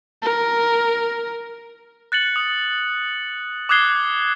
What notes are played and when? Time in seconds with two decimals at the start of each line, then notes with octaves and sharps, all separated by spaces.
0.22 A#4
2.12 F#6 A6 C#7 F#7
2.36 D#6
3.69 D6 D#6 F#6 G#6 C7 G7